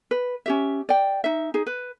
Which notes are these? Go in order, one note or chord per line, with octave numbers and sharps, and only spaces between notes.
B4
C#4 G4 E5
D5 G5
D#4 E5
D#4 G#4
B4